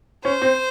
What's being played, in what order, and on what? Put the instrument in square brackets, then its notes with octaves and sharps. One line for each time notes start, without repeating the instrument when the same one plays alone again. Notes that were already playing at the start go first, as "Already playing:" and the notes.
[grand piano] C#4 [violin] C5
[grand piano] C4